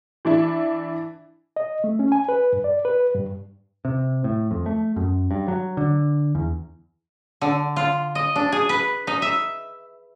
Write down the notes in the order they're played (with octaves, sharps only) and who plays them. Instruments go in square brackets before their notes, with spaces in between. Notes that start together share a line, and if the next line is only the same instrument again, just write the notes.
[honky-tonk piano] E3 D4 E4
[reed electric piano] D#5
A3
C#4
G#5
B4
G2
D5
B4
G2
[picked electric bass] C3
A2
F2
A3
F#2
G2
F#3
D3
E2
[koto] D3
F4
D#5
D4
G#4
B4
D#4
E5